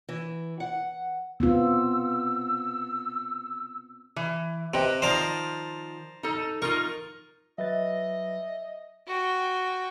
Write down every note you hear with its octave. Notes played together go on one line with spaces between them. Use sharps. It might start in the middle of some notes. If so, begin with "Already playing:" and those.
E3
F#5
B3 C4 F4 E6
E3
C3 B4 D#5 G5
D#3 F3 C5 D5 A#5
D#4 A4
D#4 F4 A#4 C#6
F#3 B4 D#5 E5 A6
F#4 G5